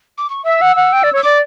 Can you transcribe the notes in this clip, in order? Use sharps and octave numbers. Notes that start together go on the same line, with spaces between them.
D6
C#6
E5 E6
F#5
F#5
G5
D5
C#5 E6
D5 D6